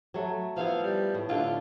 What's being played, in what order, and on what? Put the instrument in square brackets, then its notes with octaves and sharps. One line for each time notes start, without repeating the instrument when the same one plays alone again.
[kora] F#3 A3
[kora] F3 B3 E4 [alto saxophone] F5
[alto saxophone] G3
[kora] A2
[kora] D3 A3 [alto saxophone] F4